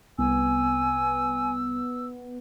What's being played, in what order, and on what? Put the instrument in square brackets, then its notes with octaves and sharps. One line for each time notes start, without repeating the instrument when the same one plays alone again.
[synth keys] C2 [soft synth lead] B3 [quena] G#5 [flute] E6